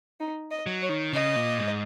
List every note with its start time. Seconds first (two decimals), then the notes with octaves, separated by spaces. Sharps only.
0.20 D#4
0.51 D#5
0.66 F#3
0.82 C#5
0.89 D#3
1.13 C#3 D#5
1.36 A#2
1.58 G#2